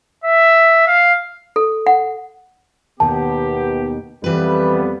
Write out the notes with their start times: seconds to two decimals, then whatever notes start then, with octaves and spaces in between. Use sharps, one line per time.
0.24 E5
0.87 F5
1.56 A4
1.86 F#5
3.00 D#2 B2 D#3 B3 G4 A5
4.24 F2 E3 G3 B3 B4